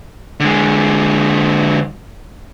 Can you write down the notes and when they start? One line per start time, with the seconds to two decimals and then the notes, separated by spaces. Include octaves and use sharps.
0.40 D3 G#3